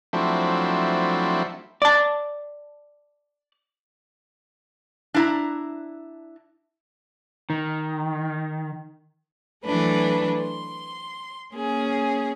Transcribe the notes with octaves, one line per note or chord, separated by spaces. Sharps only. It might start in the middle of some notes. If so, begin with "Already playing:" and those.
F3 F#3 A3 C4 D4 E4
D5 A5
D4 E4 A#5
D#3
E3 F#3 A3 D4 B4
C6
A#3 C#4 G#4